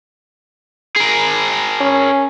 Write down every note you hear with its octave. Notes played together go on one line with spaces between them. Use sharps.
G#4 A#4
C#4